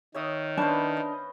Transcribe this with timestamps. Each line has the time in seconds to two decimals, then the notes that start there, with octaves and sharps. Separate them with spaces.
0.14 D#3 C#5 E5 D#6
0.57 B3 C#4 D4 C5 A5
0.97 D#5